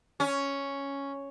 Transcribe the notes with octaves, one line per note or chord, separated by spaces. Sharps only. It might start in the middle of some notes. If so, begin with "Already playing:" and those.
C#4